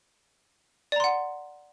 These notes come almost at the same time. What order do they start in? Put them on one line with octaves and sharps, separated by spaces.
D5 A#5 C6 F#5